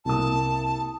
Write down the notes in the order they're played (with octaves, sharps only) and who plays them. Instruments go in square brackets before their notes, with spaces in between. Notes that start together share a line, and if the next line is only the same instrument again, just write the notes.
[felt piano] C2 A#3 D#6 [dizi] A5